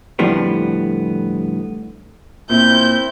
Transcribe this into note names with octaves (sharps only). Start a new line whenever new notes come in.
F2 A2 D3 F3 G3 B3
A#2 C4 E4 G6